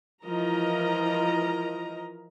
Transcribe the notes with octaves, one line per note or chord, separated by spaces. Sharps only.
E3 F3 E4 A#4 D#5 A#5